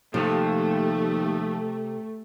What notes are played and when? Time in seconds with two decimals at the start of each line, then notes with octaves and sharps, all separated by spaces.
0.14 D#2 C3 F3 A3 A4